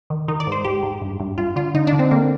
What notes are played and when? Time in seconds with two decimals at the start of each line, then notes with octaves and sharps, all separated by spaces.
0.10 D#3
0.28 D#3 D#4
0.40 D5
0.47 G#2
0.52 C5
0.65 G#2 G4
0.83 G#2
1.01 G2
1.20 G2
1.38 G2 F4
1.56 D3 F4
1.74 D3 D#4
1.87 D4
1.93 D3
1.99 C4
2.11 D3 A#3